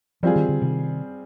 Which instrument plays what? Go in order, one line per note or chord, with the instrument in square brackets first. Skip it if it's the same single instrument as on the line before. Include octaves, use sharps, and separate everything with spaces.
[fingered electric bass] F3 [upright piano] G3 C4 F4 G#4
[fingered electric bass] D#3
D3
C3 D#3